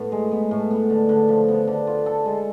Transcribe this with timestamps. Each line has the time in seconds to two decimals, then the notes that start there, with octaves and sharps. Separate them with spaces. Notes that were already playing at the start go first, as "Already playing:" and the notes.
Already playing: A2 B3
0.12 G#3
0.31 B3
0.51 A2
0.71 B3
0.90 D3
1.09 D3
1.29 F3
1.48 B3
1.67 D3
1.87 F4
2.06 A4
2.26 G#3